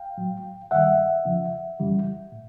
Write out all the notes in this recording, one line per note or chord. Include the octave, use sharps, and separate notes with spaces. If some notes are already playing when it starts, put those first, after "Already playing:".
Already playing: F5 G5
A2 F#3
G2 D#3 G3 E5 F#5
E2 C#3 F3
F#2 C#3 E3 G3
A2